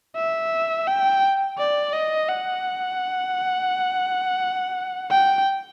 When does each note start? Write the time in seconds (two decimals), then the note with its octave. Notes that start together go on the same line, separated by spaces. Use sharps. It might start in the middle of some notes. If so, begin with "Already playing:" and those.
0.16 E5
0.87 G5
1.58 D5
1.93 D#5
2.28 F#5
5.11 G5